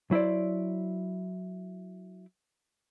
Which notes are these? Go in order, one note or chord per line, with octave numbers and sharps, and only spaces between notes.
F#3 E4 C5 D5